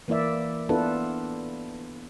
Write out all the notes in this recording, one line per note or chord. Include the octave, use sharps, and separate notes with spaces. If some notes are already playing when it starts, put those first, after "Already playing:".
E3 A#3 E4 D5 E5
B3 D4 E4 F4 A4 B4